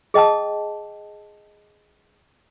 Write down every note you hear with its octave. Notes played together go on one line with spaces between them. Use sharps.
G#4 D#5 G5 A5 D#6